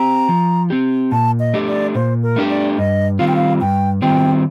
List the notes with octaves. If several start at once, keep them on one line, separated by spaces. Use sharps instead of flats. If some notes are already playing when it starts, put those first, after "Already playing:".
Already playing: C4 G4 A#5
F3
C4 G4
A#2 A5
D#5
A3 D4 G4
D5
A#2 C5
A#4
A3 D4 G4
D5
G2 D#5
D#3 G3 C4 F4 F5
G5
F5
G2 G5
D#3 G3 C4 F4 G5